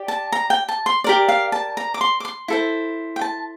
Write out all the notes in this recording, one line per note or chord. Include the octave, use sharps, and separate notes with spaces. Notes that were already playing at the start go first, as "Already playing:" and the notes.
Already playing: G4 D5
A5
A#5
G5
A5
C6
G4 A#4 D5
F5
A5
A#5
D6
C6
D6
C6
E4 A4 C5
G5
A5